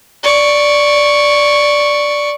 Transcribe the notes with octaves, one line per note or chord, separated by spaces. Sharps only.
D5 C#6